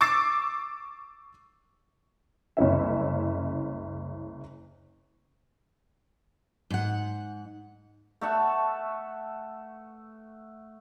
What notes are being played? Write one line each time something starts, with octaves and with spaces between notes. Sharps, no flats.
C#6 D6 E6 A6 C7
F#1 C2 C#4 E5
G#2 F#5
A3 E5 F#5 A5